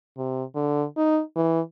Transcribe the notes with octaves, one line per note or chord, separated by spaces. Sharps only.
C3
D3
D#4
E3